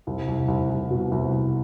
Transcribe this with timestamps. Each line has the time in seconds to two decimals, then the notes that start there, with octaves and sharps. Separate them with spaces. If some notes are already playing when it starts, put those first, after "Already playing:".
0.07 C2
0.28 C2
0.48 C2
0.70 C2
0.90 B2
1.12 C2
1.33 C2